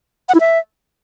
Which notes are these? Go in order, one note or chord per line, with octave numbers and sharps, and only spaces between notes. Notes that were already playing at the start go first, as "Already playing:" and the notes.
F#5
E4
E5